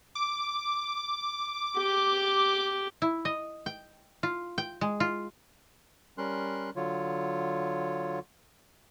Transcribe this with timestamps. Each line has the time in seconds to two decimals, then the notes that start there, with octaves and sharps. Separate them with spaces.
0.15 D6
1.77 G4
3.02 E4
3.25 D#5
3.66 G5
4.23 F4
4.58 G5
4.81 G#3
5.00 F4
6.18 G3 C#4 A#4 C6 F#6
6.76 D3 F#3 F4 C#5